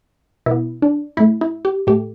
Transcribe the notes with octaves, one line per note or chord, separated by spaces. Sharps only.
B2 B3 E4
D4
A2 A3 E4
E4
G4
A2 A3 G4